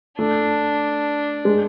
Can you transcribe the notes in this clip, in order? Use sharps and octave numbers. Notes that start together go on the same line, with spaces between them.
A3 D4
G#3